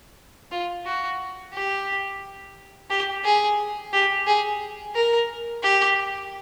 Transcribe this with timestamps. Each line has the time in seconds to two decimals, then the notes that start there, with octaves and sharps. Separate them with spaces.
0.52 F4
0.86 F#4
1.54 G4
2.90 G4
3.25 G#4
3.93 G4
4.27 G#4
4.95 A#4
5.63 G4